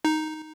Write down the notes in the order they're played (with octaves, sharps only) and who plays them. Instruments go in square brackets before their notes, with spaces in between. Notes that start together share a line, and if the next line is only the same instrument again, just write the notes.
[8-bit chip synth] D#4